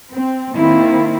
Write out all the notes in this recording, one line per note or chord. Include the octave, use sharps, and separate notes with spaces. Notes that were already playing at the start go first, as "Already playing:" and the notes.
C4
D#3 A#3 C4 E4